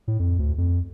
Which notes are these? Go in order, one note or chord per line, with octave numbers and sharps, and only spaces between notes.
A2
F2
D2
F2